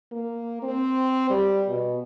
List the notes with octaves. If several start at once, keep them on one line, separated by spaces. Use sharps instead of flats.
A#3
C4
G3
B2